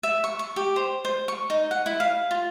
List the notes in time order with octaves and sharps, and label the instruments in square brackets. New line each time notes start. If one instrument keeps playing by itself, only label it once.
[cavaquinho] E5
C#6
C#6
G4
C5
C5
C#6
D#4
F#5
E4
F5
F4